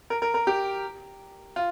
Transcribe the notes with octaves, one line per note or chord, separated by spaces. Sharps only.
A#4
A#4
A#4
G4
F4